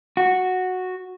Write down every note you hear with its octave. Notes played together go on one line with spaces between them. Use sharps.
F#4